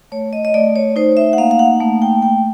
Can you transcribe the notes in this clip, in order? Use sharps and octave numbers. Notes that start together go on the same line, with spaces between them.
A3 C#5
D#5
D#5
A3 D5
C#5
D#4 C5
E5
F#5
A#3 F5
F5
F#5
A3
G5
A3 G5